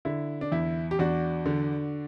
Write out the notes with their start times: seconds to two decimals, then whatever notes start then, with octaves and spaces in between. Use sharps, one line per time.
0.05 D3 E4
0.41 D4
0.52 E2 E4
0.91 G4
0.99 E2 D4 F#4
1.45 D3